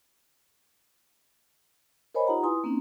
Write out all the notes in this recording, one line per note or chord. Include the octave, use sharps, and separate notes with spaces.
A#4 C5 C#5 D#5 G#5 B5
D#4 F4 G4 F#5 A#5
E4 B4 G#5 C6 D#6
A#3 C4 C#4 D#4